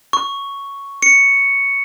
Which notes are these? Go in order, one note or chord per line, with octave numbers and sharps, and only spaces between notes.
C#6
C#7